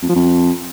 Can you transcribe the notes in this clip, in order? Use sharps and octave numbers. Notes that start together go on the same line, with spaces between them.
F2
F3
F2